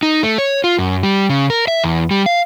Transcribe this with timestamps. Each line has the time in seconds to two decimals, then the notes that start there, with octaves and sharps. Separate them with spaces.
0.03 D#4
0.23 A3
0.38 C#5
0.64 F4
0.79 F#2
1.03 G3
1.30 C#3
1.50 A#4
1.68 E5
1.84 E2
2.11 G3
2.26 F5